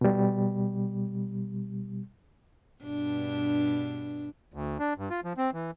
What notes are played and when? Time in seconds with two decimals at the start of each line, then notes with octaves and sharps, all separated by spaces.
0.01 B2 G3
2.83 G2 B2 D4
4.54 D2
4.79 D4
4.98 G2
5.10 F4
5.24 F3
5.37 C4
5.54 E3